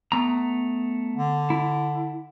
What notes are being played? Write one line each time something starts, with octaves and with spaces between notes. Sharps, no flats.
A3 B3 A#5
D3
E4